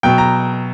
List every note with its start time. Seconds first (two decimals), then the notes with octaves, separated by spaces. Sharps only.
0.03 B2 F#3 G5
0.18 A#5